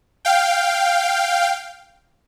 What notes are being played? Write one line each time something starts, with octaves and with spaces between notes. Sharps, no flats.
F5 G5